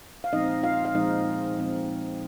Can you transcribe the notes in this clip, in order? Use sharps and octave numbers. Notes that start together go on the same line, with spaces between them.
F5
A#2 F3 G#3 C4 D#4 D#5
F4 F5
F5
A#2 F3 G#3 C4 D#4 D#5
A#2 F3 G#3 C4